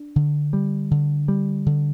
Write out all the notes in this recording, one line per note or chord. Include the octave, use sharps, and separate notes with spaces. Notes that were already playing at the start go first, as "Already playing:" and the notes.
Already playing: D4
D3
G3
D3
G3
D3